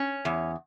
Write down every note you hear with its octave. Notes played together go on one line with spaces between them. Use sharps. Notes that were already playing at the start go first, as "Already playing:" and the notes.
Already playing: C#4
E2